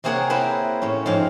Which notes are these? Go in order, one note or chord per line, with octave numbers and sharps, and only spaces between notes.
C3 A#3 C4 G#4 C#5 F#5
A#3 C4 E4 B4 C5
A2 C#4
F2 G#2 C4 F5